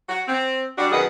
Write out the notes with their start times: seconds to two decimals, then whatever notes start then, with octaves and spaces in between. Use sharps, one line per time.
0.08 F#4
0.27 C4
0.77 G3 D4 F#4
0.92 F#2 B2 D#3 G#4 B4 F#5